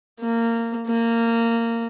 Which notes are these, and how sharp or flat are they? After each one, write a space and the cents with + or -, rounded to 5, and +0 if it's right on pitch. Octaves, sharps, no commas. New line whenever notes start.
A#3 -20
A#3 -15